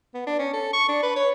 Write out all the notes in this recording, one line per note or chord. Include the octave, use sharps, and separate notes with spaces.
B3
D4
C#4
A4
C#6
D4
B4
C#5